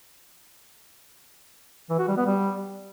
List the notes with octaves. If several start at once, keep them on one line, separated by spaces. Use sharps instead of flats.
E3
F#4
G3
B3
G3